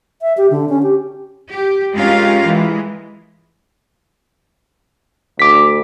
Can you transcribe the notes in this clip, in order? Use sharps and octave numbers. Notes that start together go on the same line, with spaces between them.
E5
G4
D3
C#4
G4
G4
G#3 C#4 F4 G4 A#4 F5
E3 G#3
D2 D6 B6